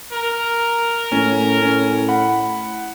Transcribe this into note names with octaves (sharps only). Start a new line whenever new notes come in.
A#4
A2 C#4
C#4
F#5 B5